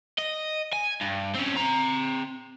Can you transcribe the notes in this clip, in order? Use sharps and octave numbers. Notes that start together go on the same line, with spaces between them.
D#5
G#5
G2
C4 C#4
C4 A#5